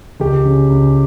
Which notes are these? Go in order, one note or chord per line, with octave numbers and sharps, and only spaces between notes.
C#2 G4
C#3
C#2